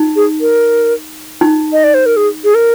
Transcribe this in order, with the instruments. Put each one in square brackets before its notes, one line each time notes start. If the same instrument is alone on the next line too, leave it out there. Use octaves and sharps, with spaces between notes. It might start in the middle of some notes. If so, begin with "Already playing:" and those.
Already playing: [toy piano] D#4
[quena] G#4
A#4
[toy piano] D#4
[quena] D#5
D5
C5
A#4
G#4
G#4
A#4